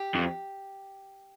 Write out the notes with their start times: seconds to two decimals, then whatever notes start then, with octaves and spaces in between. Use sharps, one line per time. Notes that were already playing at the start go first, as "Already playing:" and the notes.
Already playing: G4
0.15 F2